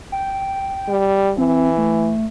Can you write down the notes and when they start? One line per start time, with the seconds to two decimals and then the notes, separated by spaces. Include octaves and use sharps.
0.12 G5
0.88 G3
1.38 E3 C4
1.78 A3